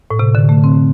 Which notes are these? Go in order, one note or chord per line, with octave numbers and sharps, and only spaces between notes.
A2
C3
D3
A3
C4